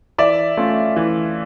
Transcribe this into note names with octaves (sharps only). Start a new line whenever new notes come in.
E3 D5 E5
A3 C#4 F4
E3